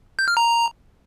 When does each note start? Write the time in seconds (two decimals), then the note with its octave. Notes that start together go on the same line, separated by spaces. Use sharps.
0.19 G6
0.28 F6
0.37 A#5